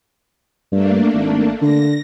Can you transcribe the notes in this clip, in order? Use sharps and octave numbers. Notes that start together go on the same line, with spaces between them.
G2 A3 A#3 D4
G#1
D3 A#6